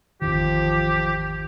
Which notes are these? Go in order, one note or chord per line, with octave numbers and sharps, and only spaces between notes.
G#1 E2 D#3 F3 G4